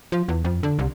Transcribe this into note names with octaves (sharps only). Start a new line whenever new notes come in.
F3
E2
F2
D3
C2